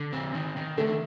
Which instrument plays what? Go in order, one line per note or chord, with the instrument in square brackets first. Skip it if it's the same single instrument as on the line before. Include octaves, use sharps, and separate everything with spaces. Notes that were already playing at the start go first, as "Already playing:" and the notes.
Already playing: [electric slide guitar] D3
C4
D#3
D#3
[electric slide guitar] D3 [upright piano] A3